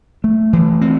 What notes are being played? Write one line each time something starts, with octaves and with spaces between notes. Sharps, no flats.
A3
E3
C4